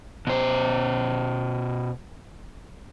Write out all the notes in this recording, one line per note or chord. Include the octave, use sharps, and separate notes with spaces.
B2 C5